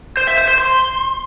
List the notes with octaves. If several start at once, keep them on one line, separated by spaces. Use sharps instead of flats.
C5
E5
C5
C5
C6